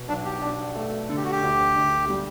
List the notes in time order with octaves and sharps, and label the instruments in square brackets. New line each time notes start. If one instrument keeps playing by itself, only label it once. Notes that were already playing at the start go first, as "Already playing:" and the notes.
Already playing: [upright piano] B2
[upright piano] B1 [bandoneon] D4
[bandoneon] G4
[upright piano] D4
A3
[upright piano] D3 [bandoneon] A4
[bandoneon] G4
F#4
G4
[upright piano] D2
D2
G3